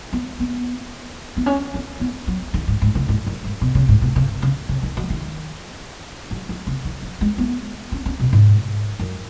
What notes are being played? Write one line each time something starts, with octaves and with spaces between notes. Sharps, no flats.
B3
B3
B3
C#4
C#4
B3
F#3
D#3
G#2
G#2
C#3
G#2
F#2
G#2
B2
C#3
G#2
B2
C#3
C#3
C#3
D#3
F#3
D#3
F#3
F#3
C#3
D#3
F#3
G#3
B3
C#4
C#4
B2
G#2
F#2